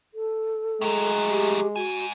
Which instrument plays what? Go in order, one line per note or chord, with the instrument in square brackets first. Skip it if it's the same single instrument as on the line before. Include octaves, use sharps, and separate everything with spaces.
[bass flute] A4
[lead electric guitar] A2 F#3 [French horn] G#3
[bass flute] G4
[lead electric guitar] G#2 G#5 [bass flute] F#4